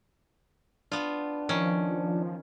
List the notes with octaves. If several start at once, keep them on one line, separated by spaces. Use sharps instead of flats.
B3 D4 F4
D#3 F3 C#4